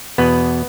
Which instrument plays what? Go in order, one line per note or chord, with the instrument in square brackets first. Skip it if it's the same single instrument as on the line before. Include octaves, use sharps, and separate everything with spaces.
[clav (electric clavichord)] E2 B2 B3 B4